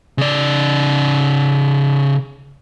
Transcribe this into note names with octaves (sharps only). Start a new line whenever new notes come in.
C#3 D5